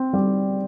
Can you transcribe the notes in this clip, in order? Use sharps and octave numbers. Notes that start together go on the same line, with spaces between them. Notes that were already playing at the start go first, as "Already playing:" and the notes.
Already playing: C4
G3